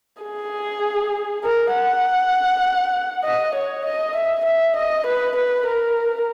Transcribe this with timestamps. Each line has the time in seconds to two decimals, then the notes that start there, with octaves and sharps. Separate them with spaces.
0.23 G#4
1.44 A#4
1.74 F#5
3.25 D#5
3.54 C#5
3.85 D#5
4.15 E5
4.45 E5
4.76 D#5
5.06 B4
5.36 B4
5.66 A#4